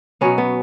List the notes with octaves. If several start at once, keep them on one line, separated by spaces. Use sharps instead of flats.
B2 F#3 B3 C#4
B3